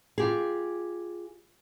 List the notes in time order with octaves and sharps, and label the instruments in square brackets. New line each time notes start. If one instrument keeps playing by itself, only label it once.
[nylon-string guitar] F4 G4 G#4